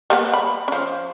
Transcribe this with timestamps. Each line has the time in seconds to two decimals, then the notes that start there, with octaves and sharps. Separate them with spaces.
0.10 G3 A#3 B3
0.33 B5
0.68 F3 C#4